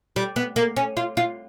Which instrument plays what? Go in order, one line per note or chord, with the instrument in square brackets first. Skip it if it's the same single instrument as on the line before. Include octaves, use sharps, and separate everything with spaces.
[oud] G3
B3
A#3
C#4
F4
F4